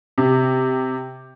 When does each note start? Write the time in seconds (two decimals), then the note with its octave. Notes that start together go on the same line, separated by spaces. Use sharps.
0.18 C3